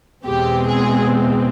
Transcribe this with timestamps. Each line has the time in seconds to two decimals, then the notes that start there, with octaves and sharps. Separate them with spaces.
0.25 E2 B2 G#3 C4 G4
0.67 G#4